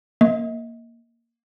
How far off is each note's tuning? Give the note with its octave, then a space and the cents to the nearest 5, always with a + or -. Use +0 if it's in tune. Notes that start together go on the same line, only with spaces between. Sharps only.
A#3 +0 D#5 +40